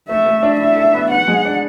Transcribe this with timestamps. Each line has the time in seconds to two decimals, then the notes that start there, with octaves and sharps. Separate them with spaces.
0.09 A3 E5
0.26 A3
0.43 D4
0.59 E4 E5
0.76 A4
0.94 B3
1.10 B4 F#5
1.28 G#3
1.45 D4